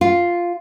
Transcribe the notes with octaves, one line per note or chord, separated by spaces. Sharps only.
F4